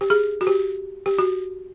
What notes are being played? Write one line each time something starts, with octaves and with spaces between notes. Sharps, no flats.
G4
G#4
F#4
G4
G4
F#4